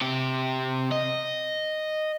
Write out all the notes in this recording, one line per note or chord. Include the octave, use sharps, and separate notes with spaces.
C3 G4
D#5